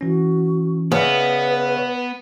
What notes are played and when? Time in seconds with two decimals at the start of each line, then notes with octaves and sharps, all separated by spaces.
0.01 E3 C#4 F#4
0.92 C#3 B3 B4 D5 E5